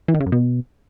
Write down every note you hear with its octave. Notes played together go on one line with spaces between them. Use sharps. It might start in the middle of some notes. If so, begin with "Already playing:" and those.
E3
D#3
C#3
F#2
B2